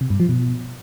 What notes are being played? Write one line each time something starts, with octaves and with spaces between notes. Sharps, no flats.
C3
G2
F3
B2